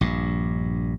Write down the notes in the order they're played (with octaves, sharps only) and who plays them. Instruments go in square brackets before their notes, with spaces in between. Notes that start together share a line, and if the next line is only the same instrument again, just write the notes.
[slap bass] A#1 G2